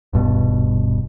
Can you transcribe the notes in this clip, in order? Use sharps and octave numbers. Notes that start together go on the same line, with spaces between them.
D#1 G2 B2